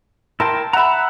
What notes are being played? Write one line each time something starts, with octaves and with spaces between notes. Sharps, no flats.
E4 A#4 G5 A5 C6
E5 F#5 A#5 B5